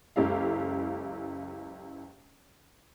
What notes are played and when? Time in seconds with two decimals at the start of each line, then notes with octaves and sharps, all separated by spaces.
0.16 F#1 C#2 E4 G4 A4 F5